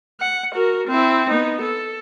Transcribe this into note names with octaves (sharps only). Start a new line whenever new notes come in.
F#5
F#4 A#4
C4 E4
B3 D#4
A4